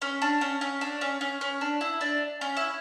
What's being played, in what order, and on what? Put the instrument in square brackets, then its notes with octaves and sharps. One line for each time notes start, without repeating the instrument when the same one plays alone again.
[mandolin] C#4
D4
C#4
C#4
D4
C#4
C#4
C#4
D4
E4
D4
C#4
E4